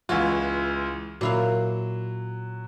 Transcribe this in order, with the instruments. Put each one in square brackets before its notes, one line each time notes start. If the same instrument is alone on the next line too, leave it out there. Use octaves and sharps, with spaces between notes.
[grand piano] C#2 E3 F4 [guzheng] F#4
[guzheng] A#2 E4 F5 [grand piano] F#3